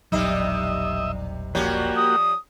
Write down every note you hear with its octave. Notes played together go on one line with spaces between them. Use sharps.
E1 A#1 C3 F#3 G3 D#4 D#5 E5
F3 G3 A#3 C#4 F#4 G4
D#6